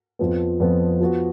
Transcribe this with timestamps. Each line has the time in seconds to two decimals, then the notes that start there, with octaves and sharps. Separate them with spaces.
0.19 F2 F3 B3
0.60 F2 F3 B3
1.00 F3 B3 F#4